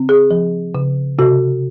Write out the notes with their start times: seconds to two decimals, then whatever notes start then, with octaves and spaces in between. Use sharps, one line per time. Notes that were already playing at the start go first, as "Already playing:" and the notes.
Already playing: C#3 C4
0.09 G#4
0.31 F3
0.75 C#3
1.19 C3 F#4